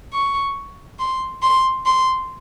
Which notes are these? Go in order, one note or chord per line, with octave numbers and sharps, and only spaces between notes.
C#6
C6
C6
C6